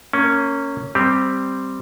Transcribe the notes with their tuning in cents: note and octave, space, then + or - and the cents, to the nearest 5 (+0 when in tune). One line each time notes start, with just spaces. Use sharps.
A#3 -20 C#4 +0
G3 +0 C4 +0 G4 +0